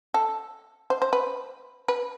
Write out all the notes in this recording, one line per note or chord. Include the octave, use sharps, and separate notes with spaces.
A4
C5
C5
B4
B4